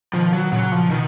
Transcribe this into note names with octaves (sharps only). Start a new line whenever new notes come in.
B2 D#3 F3
F#3
A#2 C#3 F#3
F3
B2 D#3